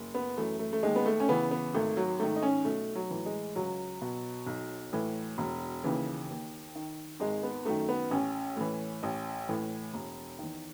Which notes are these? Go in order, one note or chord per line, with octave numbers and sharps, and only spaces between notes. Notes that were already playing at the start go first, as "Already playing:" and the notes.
Already playing: F#1
B3
F#2 E3 A3
A3
A3
D#2 G#3
B3
A3
C#4
C#3 E3 B3
B3
G#1 A3
F#3
G#2 D#3 A3
D#4
C#4
B1 A3
F#3
A2 E3
G#3
C#2 F#3
B2
B1
A2 E3
E1
D#2 C#3 E3
D#2
D#3
G#1 G#3
B3
F#2 D#3 A3
B3
A1 C#4
A2 E3
A1
A2 E3
E1
E2 D#3